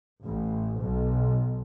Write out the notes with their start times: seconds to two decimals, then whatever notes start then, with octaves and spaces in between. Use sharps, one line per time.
0.22 A1
0.81 B1